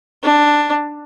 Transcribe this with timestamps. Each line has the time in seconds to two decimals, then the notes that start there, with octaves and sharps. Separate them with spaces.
0.23 D4